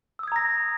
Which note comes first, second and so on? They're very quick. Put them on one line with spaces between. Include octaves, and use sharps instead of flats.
E6 D#6 G#6 A#5 A#6